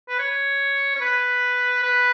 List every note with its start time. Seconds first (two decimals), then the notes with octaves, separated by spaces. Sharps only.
0.09 B4
0.19 C#5
0.95 C#5
1.01 B4
1.83 B4